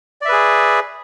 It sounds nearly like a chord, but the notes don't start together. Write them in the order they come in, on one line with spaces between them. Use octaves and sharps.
D5 E5 B4 G#4